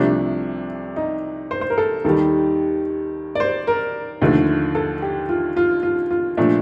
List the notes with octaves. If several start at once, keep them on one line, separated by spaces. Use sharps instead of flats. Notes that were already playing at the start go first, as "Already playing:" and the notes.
Already playing: C2 C3 F3 A3 D4
D#4
C5
C5
A#4
A4
D#2 D#3 G3 A4
D5
C5
A#4
D#2 D3 F3 A3
A4
G4
F4
F4
F4
F4
A#2 F3 A3 D4